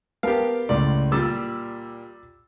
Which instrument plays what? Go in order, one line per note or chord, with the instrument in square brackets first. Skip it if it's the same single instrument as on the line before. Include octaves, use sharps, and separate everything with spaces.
[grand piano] B3 A#4 A5 [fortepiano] G4 F5
[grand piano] C#2 A2 A3 [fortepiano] D5
[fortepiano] A#2 G3 [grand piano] D6 E6 A6